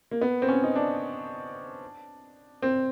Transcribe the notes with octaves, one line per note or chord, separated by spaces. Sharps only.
A#3
B3
C4
C#4
D#4
D4
C4